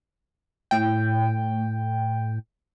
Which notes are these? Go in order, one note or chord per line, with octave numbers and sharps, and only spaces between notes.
A2 G5